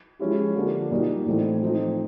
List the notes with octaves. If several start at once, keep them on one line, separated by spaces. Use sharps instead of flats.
F3 G#3 C#4 E4 G4
D3 F3 A#3 D4 G4
A#2 G3 A#3 D#4 F#4
A2 E3 A3 C4 D#4
F3 A3 C4 D#4